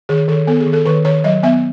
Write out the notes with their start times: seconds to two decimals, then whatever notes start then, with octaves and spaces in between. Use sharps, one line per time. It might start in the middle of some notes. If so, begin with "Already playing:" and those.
0.09 D#3 G#4
0.28 D#3 A4
0.47 B3 A4
0.60 G#4
0.66 D#3
0.73 A4
0.85 D#3 B4
1.05 D#3 C#5
1.24 F#3 D#5
1.43 B3 E5